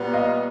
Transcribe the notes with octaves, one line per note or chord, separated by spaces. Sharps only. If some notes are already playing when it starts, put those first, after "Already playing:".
Already playing: A#2 G3 B3
D#5 F5